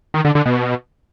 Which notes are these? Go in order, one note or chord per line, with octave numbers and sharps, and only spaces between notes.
D#3
D3
D3
B2